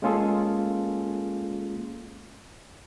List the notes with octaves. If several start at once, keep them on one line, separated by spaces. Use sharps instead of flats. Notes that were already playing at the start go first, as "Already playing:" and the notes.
G#3 A#3 C#4 F4 G#4 A4